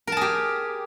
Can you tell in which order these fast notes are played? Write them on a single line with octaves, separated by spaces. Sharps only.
A#4 A5 G#4 G4